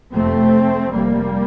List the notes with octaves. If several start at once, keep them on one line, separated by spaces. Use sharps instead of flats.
F1 F2 C3 A3 C4
F1 F2 C3 G3 A#3